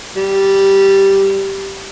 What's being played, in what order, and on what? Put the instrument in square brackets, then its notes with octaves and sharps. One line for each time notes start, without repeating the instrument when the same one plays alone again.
[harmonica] G3